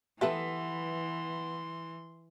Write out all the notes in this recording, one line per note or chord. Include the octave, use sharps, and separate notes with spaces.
E3 B3 G4 A4 B4 E5 C6